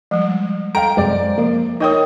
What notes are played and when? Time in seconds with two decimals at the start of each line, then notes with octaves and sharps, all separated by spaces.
0.11 F3 G3 G#3
0.75 A4 F5 G5 A#5 D7
0.97 F#2 C3 G#3 C5 D5
1.38 F3 A#3
1.80 D#4 A#4 C#5 D#5 G5 D#6